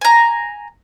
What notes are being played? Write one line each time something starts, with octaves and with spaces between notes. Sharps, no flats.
G#5 A#5